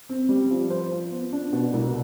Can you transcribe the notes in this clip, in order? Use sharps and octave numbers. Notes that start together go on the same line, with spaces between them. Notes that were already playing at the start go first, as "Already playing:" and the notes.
C4
G3
F3
C5
F4
B3
D4
B2
C2